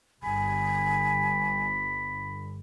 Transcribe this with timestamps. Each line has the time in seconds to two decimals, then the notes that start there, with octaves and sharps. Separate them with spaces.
0.23 G1 G#5 B5